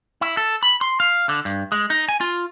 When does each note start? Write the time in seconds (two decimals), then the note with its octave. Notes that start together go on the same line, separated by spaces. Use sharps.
0.21 E4
0.37 A4
0.63 B5
0.81 C6
1.00 F5
1.29 D3
1.45 G2
1.72 G#3
1.90 D#4
2.09 G#5
2.21 F4